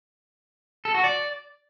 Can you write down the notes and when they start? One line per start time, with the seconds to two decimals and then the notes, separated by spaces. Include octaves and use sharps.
0.85 A4
0.94 F#4
1.04 D5